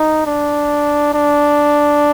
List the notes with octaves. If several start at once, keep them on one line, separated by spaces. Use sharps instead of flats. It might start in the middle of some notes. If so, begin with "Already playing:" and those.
Already playing: D#4
D4
D4